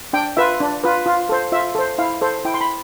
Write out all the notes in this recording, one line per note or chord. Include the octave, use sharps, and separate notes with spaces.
D4 G5
F4 B4 E5
D4
F4 B4
F4
A4 C5
F4 E5
A4 C5
E4 F5
A4 C5
E4 G5
C6
B5